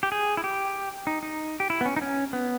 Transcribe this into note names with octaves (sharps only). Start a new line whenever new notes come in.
G4
G#4
E4
G4
D#4
D#4
G4
E4
B3
C#4
D#4
C#4
B3